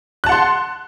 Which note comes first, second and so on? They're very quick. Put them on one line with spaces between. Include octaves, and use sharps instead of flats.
F#6 A5 F#5 C6